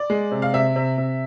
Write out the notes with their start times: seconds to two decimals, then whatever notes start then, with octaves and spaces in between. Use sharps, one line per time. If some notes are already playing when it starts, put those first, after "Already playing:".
Already playing: D5
0.10 G#3
0.32 C3
0.42 F5
0.54 C3 E5
0.76 C3
0.98 C3